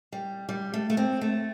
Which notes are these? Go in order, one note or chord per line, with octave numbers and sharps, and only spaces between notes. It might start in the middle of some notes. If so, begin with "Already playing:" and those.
G3
G3
A3
A3
C4
A3